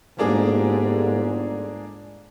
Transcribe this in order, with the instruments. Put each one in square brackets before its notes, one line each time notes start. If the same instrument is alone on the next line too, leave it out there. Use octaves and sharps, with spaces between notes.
[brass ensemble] G1 [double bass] G#2 [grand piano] A#3 D4 G#4